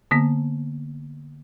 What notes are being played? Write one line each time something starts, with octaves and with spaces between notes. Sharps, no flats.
D3 A#3 B3